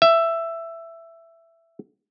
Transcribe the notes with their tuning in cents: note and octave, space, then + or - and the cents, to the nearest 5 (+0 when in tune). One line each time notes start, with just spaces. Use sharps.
E5 +10